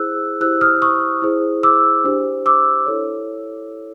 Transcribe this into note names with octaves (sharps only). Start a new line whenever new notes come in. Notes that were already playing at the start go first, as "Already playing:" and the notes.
Already playing: E4 G#4 C5 E6 F#6
E4 G4 C5 E6 F#6
D#6 F6
C#6 D#6
E4 G#4 C5
D6 E6
D4 G4 C5
D6 E6
E4 A4 C#5